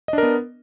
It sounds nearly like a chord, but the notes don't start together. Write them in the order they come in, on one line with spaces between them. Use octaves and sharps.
D#5 D4 A#4 B3